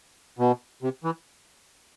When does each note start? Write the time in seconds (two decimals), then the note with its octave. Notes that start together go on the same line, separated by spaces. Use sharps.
0.39 B2
0.82 C3
1.04 E3